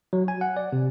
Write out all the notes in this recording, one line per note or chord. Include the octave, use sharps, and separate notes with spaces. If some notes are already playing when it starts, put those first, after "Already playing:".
F#3
G#5
F#5
D5
C3